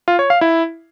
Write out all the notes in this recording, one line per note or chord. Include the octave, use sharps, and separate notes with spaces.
F4
C#5
F5
E4